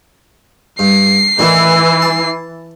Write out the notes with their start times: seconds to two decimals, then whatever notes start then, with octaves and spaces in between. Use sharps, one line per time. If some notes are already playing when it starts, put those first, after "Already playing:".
0.79 G2 C7
1.39 A1 D#3 E3 D4
2.02 A5